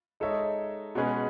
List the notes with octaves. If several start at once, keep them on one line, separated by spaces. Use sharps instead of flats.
G#3 D#4 A4 C#5 E5
B2 G#3 C#4 G#4 B4